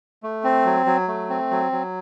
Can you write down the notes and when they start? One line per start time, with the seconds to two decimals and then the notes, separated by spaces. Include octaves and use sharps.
0.23 A3
0.44 C4
0.65 F#3
0.86 F#3
1.08 A3
1.30 C4
1.51 F#3
1.72 F#3